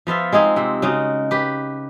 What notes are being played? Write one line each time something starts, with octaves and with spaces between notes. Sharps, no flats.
F3 B3 F4 E5
G#3 C4 D#4 G#4
C3 C4
C#3 G#3 D#4 F#4
G4 B4